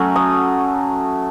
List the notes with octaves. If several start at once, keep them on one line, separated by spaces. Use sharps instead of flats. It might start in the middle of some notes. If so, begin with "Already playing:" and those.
Already playing: F#3 A3 C#4
D#6